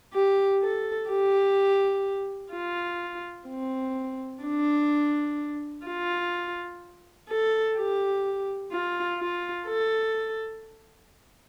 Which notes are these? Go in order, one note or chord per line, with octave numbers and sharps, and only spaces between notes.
G4
A4
G4
F4
C4
D4
F4
A4
G4
F4
F4
A4